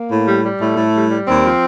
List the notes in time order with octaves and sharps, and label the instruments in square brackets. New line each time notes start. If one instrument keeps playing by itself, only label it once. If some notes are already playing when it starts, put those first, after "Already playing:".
Already playing: [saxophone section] A#3
A2
G3
G3
A2 A3
A2
G3
G3
D#2 C4
F3